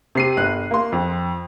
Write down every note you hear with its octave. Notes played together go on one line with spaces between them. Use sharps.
C3 C7 D#7
G1 F#6
A#3 C6
F2